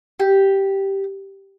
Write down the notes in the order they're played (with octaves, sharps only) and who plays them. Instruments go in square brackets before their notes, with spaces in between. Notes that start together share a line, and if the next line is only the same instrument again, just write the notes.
[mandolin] G4